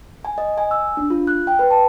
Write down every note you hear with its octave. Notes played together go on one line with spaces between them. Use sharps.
G#5
D#5
G#5
E6
D4
F4
F#6
G5
B4
A5